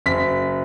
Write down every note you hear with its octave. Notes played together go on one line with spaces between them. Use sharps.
F#1 B6